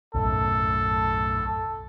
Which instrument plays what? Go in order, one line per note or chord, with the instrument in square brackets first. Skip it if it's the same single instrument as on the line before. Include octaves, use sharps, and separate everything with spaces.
[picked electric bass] B1 F#2 A2 [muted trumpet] A4